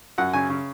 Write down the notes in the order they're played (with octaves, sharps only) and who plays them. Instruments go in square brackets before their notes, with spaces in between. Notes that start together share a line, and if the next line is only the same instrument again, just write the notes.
[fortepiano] F#2 F#5
C#3 G#5
C#3